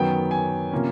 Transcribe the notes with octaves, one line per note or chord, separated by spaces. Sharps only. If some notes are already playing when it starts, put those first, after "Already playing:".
Already playing: F#2 D#3 F#3 B3 G5
G#5
C3 F3 A#3 C#4